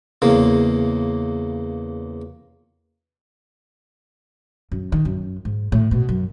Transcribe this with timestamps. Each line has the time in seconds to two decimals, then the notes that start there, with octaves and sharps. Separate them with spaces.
0.22 E2 C#3 A#3
4.72 F#2
4.92 D#3
5.05 F#2
5.45 G#2
5.72 A2
5.91 B2
6.09 F#2